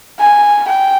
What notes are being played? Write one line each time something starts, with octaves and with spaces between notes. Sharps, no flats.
G#5
G5